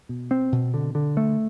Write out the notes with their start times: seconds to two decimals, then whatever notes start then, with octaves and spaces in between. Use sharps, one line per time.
0.09 B2
0.31 C4
0.52 B2
0.74 D3
0.95 D3
1.17 A3